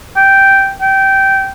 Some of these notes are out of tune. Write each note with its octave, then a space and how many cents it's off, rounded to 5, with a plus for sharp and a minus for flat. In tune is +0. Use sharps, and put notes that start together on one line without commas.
G5 -5
G5 -15